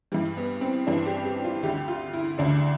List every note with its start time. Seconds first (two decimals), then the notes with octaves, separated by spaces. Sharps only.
0.12 G2 E3 G3
0.37 B3
0.61 C4
0.87 G2 E3 D4
1.06 G4
1.25 G4
1.44 F4
1.63 D2 D3 G4
1.88 F4
2.13 E4
2.38 D2 D3 D4